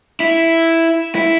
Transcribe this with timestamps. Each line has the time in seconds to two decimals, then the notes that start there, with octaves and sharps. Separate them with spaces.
0.20 E4
1.15 E4